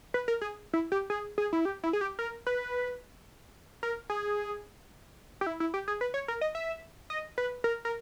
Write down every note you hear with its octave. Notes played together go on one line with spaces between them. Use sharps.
B4
A#4
G#4
E4
G4
G#4
G#4
E4
G4
E4
G#4
G4
A#4
B4
A#4
G#4
G4
E4
E4
G4
G#4
B4
C#5
A#4
D#5
E5
D#5
B4
A#4
A#4